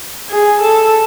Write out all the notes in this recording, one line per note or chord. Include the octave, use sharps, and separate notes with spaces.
G#4
A4